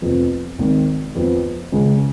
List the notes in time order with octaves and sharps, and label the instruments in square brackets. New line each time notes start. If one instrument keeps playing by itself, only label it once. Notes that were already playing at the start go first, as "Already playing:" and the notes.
[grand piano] F1 F2 F3 B3
G#1 G#2 D#3
F2 F3 B3
C#2 C#3 G#3